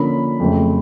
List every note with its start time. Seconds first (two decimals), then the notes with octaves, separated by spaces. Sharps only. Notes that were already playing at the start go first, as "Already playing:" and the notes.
Already playing: D3 F3 A#3 C#4 B5
0.40 F2 C#3 F#3 A3